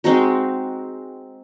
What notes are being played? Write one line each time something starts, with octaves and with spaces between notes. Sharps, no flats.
G#3 C4 D#4 F#4